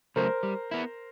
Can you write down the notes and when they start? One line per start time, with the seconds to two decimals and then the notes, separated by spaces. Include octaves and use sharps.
0.16 C#3 F#3 A3 A#4 C5
0.43 G3
0.71 B3 E4